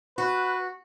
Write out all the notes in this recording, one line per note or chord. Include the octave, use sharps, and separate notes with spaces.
F#4 B4